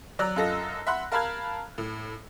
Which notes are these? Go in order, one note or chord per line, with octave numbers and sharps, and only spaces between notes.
F#3 D5 A#5 E6 F#6
F#2 F4 A4 D#5 A#6
E5 F#5 B5 C6 F#6
A#4 F5 A5 B5 F6 G#6
A2